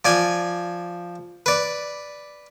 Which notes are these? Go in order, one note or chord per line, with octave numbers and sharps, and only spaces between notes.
F3 D5 G#5
B4 D5